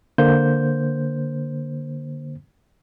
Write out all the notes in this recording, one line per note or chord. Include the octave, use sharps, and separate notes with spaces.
D3 A#3 C5 G6